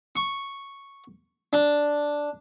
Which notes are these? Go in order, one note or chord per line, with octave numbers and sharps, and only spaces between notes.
C#6
D4